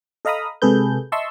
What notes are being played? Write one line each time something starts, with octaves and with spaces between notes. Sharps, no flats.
A4 D#5 F5 A#5 B5 D#6
C3 G#3 G#4 A4 B4 G6
D#5 E5 A5 C6 C#6 E6